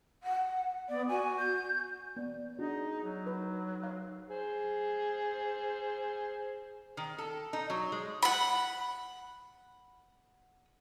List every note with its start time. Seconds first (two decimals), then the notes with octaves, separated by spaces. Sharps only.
0.23 F#5
0.89 B3 D5
1.09 F#4 G#5
1.39 G6
2.16 B3 D5
2.59 D4 D#4 F#4 G#4
3.03 F#3
3.27 D#4 B4
3.83 F5
4.30 G#4 C5
6.97 D#3
7.18 A4
7.53 D#4
7.70 F#3
7.92 G#3
8.22 F#5 B5